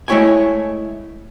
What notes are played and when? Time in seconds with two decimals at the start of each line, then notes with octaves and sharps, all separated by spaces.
0.08 G#3 A3 E4 C#5 G5 G#5